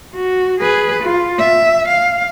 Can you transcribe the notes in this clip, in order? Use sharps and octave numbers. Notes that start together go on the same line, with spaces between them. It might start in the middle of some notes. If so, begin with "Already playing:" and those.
F#4
G#4 B4
F4
E5
F5